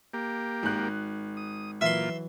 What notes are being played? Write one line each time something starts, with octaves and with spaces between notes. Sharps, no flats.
A#3 G4
G#1 F#6
D#6
A#2 E3 F#3 F4 E5 C6